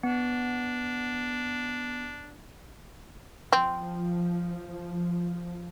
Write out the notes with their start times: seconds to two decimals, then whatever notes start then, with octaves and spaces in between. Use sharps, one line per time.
0.03 B3 D4
3.52 F3 C4